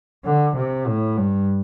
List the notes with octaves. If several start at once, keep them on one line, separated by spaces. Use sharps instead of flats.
D3
C3
A2
G2